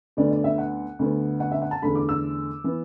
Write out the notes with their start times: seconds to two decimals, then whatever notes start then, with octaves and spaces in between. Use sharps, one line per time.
0.17 D2 D3 B3 D5
0.31 D5
0.44 E5
0.58 F#5
0.99 D2 D3 B3
1.40 F#5
1.52 E5
1.62 F#5
1.71 A5
1.82 E2 D3 A3 B5
1.95 D6
2.09 E6
2.64 E3 B3